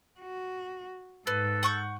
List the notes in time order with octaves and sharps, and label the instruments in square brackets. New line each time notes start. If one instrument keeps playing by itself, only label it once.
[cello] F#4
[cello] G#2 [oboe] A4 [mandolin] B4
[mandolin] F#5 C#6 G6